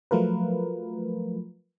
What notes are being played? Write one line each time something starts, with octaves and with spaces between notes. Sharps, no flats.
F3 F#3 A3 F4 A#4 B4